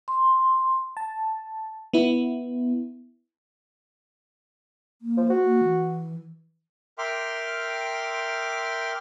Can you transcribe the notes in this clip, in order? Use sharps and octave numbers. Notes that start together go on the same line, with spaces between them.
C6
A5
B3 E4
A#3
F3
F#4
A#3
E3
A#4 E5 G5 C6 D6 F6